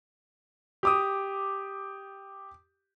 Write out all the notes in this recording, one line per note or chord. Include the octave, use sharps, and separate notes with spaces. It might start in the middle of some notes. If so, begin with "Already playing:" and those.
G4 D6 D#6